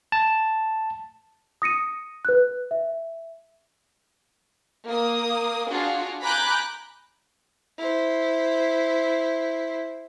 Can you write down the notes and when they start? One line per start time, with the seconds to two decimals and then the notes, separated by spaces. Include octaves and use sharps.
0.12 A5
1.62 D#6 A#6 C#7 D#7
2.25 B4 F#6
2.71 E5
4.87 A#3 D#6
5.69 D4 F4 F#4 G#4
6.22 G#5 A#5 B5 D6 F#6 G6
7.78 E4 C5